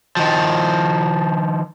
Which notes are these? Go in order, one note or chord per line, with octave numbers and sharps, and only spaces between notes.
D#3 F3